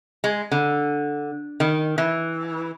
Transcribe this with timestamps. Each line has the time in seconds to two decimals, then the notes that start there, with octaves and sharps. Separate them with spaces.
0.24 G#3
0.51 D3
1.60 D#3
1.98 E3